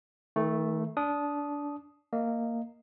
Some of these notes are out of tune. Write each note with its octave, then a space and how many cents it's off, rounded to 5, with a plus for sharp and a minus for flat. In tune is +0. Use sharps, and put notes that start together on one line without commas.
D#3 +40 A3 +0
D4 -20 D#6 +0
A#3 -10 D#5 +0